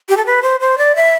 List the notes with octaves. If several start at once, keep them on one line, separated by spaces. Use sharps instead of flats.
G4
A4
B4
C5
C5
D5
E5